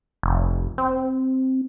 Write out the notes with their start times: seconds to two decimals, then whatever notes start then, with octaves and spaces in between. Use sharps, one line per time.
0.23 F1
0.78 C4